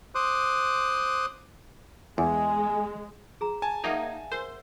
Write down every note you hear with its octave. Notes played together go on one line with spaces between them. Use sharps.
C5 C6 D6 D#6 F#6
E2 G#3 G#5
G#4 A#5
G#5 A5
A#3 D#4 D5 E5 F#5
A#4 C5